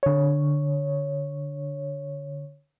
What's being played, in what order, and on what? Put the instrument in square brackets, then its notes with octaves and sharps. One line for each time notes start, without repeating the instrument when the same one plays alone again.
[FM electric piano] D3 C#5